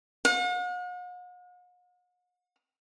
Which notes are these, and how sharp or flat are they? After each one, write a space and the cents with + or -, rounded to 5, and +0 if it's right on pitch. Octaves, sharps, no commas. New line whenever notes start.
F#5 -45